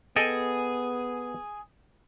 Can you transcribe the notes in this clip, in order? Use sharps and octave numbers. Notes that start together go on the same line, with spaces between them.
B3 G#4 A4 D#5 G5 G#5